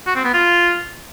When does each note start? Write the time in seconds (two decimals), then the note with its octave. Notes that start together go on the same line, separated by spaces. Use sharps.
0.07 F#4
0.16 C4
0.25 B3
0.34 F4